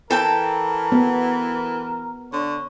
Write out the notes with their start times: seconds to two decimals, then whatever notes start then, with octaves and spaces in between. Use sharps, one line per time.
0.10 E3 A4 A#4 G5 A5
0.92 B3 A#4
2.33 D3 C#5